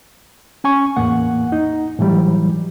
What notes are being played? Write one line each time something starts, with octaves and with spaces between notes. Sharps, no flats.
C#4 G#5 C#6
E2 A2 A#3 F#5
D#4
A2 E3 F#3 G3